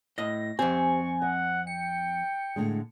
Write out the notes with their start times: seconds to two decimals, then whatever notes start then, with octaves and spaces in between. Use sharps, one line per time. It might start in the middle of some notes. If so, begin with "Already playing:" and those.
0.18 A2 D#5 A#6
0.59 F2 C4 G4 C5 G#5 C#6
1.22 D#5 F#5
1.67 G5 C#7
2.56 A2 D3 G#3